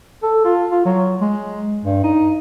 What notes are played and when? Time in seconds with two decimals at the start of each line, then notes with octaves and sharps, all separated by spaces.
0.23 A4
0.45 F4
0.71 F4
0.85 F#3
1.21 G#3
1.85 G2
2.04 D#4